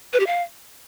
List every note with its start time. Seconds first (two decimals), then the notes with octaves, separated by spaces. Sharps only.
0.13 B4
0.20 G4
0.27 F5